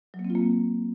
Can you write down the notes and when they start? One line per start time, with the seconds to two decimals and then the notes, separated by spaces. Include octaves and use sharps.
0.14 F#3
0.19 A#3
0.25 C4
0.30 F4
0.35 A#3